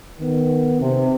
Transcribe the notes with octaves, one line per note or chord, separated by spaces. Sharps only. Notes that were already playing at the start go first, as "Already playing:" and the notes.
D#3 B3
C3